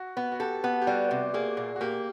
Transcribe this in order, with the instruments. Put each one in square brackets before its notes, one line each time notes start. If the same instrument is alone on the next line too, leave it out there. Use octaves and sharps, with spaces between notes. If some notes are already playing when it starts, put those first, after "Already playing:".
Already playing: [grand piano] F#4
[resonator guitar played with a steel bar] B3
[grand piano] F#4
[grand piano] G4 [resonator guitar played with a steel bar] A4
[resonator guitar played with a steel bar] B3
[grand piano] G4
[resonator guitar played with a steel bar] G3 [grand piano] F#4
[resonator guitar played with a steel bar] C3
[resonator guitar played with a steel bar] A#3 [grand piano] G#4
[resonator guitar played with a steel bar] A#2
[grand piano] F#4
[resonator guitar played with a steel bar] A#3 [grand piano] G4